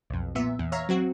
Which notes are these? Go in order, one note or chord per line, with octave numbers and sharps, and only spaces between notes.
B1 F2
A#2 B3 E5
E2
C#5 E5 F5 A#5
F#3 C4 F#4